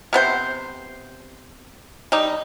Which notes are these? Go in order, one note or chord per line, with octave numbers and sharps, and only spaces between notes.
C3 B3 C5
G3 D#4